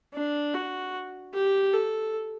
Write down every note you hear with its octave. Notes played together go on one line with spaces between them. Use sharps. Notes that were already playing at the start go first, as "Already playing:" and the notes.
D4
F#4
G4
A4